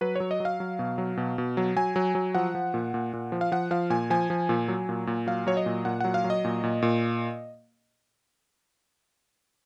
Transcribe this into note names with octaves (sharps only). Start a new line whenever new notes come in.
F#3 B4
F#3 C#5
D#5
F#3
F5
F#3
B2
F#3
B2
B2
F#3
F#3 G#5
F#3
F#3
F3 F#5
F3
A#2
A#2
A#2
F3
F5
F3 F#5
F3 F5
A#2 G#5
F3 G#5
F3
A#2
F#3
A#2
A#2
F#3 F5
F#3 C#5
D#5
A#2
A#2 F#5
F#3 F#5
F5
F#3
D#5
A#2
A#2
A#2